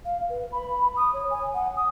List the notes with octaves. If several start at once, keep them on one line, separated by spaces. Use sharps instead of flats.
F5
B4
B5
D#6
C#5
G#5
F#5
D#6